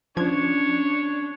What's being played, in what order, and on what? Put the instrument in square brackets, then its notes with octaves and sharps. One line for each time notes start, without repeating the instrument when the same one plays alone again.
[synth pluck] F3 G#6 [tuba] C#4 [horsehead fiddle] D4 [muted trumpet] C#5